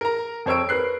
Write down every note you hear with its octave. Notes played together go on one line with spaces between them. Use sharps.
A#4 A#5
F2 C5 C#5 E6 D7
A#4 B4 F#6 C7